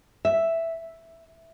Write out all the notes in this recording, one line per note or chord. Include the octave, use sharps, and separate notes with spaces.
E5